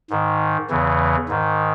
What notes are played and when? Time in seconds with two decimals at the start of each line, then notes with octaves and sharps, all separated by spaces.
0.10 G#2 D#3
0.70 E2 C#3 E3
1.29 G#2 D#3